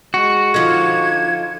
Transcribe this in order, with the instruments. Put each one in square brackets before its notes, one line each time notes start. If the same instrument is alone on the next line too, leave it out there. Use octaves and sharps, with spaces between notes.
[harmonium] G#3 [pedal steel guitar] F#4
[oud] D3 F3 [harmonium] D#4 F4 D#5 [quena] G#6